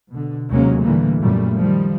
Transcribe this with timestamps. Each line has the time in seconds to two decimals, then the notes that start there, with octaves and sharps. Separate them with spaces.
0.11 B2 D3
0.50 D#2 C3 F#3 G#3 A#3 C#4
0.83 A#2 D3 E3 G3 A3 A#3
1.19 F#2 A#2 G3 A3
1.57 D#3 F3 G3